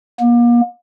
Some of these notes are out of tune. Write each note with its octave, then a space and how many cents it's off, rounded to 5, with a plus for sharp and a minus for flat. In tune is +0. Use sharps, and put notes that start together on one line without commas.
A#3 +40